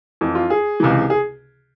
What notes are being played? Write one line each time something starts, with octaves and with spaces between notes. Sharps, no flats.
F2 E3
F4
G#4
C#2 C3 E3
G#4